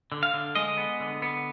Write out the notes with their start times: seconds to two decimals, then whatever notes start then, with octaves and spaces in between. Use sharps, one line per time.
0.12 D3
0.23 F5
0.34 D3
0.55 G#3 D#5
0.77 B3
1.00 D3
1.22 B3